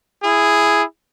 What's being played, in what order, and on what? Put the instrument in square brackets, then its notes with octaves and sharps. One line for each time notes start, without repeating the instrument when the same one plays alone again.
[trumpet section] E4 G#4